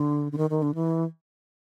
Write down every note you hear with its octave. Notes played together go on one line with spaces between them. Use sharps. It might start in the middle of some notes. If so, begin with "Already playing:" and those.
Already playing: D3
D3
D#3
D#3
D3
E3